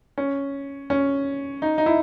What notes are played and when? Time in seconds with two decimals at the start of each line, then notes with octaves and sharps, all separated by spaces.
0.18 C#4
0.90 C#4
1.62 D#4
1.78 D#4
1.86 E4